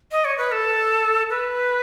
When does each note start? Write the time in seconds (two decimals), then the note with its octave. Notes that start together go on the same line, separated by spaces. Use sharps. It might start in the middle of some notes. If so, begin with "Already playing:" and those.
0.12 D#5
0.25 C#5
0.38 B4
0.52 A4
1.30 B4